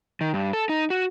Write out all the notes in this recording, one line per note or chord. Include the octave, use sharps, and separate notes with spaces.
D#3
G2
A4
D#4
F#4